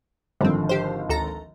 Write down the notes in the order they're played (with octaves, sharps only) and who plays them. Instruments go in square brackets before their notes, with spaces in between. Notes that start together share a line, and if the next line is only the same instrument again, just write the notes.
[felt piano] G#1 D3 F3 [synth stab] G3 C4
[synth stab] G4 C5
D2 A4 A#5